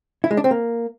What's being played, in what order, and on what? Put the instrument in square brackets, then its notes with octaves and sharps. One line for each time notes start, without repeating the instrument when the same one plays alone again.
[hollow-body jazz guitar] E4
G#3
D4
C4
A#3